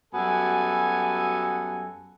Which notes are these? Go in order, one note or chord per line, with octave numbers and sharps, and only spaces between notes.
F#2 G3 B3 F#4 A4 G#5